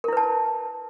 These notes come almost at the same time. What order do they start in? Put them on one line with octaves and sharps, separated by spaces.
A#4 E4 B4 A5